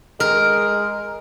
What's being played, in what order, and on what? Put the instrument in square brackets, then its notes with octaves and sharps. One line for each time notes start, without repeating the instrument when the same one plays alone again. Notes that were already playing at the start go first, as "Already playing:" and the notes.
[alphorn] G#3 [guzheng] A#4